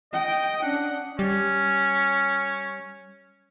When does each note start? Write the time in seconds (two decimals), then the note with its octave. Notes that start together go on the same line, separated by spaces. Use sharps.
0.13 D#5 G5
0.62 C#4 D4 F#5
1.19 G3 C#4